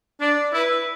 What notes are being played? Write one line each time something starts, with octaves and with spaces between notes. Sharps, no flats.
D4 D5
E4 B4